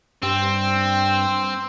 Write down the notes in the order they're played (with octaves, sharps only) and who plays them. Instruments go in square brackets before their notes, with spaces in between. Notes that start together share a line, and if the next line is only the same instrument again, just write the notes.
[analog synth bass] G2 [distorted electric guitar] C4 [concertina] G5 E6